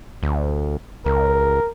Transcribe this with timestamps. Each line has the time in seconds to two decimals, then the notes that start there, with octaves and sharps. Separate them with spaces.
0.23 D2
1.06 C#2 A#4